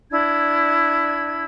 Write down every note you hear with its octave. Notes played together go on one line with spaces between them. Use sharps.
D4 E4 G#6